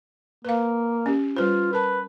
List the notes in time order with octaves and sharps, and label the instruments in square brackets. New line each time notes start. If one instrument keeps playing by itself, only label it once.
[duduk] A#3 [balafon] B4 F5
[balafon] C#4 G4
[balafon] G3 B4 C5 [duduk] F4
[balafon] A#4 A5 [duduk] B4